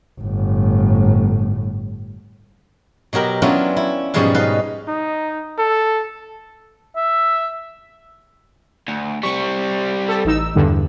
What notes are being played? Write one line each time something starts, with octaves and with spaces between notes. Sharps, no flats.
G1 A2
B2 F#3 G4 A#4 B5
F#3 B3 C#4 D4 E4 F4
E4
G#2 B2 F3 G3 C#4 G#4
D#4 B4 F5
D#4
A4
E5
D2
G3 C4 C#6
A4
A1 D#4 E6
E2 G2 D3